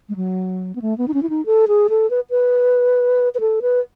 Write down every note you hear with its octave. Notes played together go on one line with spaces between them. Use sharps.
G#3
F#3
B3
A3
B3
D#4
C#4
E4
D#4
A4
G#4
A4
B4
B4
B4
A4
B4